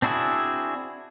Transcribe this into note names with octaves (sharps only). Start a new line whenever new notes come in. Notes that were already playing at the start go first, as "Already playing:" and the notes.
C4 D4 E4 F#4 G#4